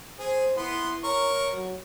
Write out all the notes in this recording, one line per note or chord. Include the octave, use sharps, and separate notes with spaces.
G#4 C5
B3 E4 C6
A#4 C#5 C#6
F#3